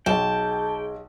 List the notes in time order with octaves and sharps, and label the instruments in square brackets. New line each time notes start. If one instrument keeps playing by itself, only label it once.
[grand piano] B1 [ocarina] G#4 [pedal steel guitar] G5 [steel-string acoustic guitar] A5